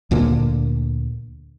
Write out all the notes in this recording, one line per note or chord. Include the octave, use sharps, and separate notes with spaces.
D2 A#2 D3 A#3